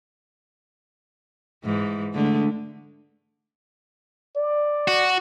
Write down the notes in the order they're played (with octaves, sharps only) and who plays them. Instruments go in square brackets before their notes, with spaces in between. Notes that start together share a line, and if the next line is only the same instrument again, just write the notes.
[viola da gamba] G#2 E3
D3 G#3 A3
[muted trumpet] D5
[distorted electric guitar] F#4